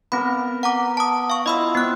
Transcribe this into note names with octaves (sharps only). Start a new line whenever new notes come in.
B3 C4 A#4 B5
F#5 A#5 D6
A5 D#6
F5 C#6
E4 F4 D#5 B5 E6
B3 C4 F#6